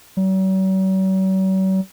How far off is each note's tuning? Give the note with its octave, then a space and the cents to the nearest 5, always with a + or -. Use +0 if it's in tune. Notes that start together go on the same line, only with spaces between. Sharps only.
F#3 +45